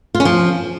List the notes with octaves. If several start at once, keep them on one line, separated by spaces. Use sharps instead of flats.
F4
C#4
F3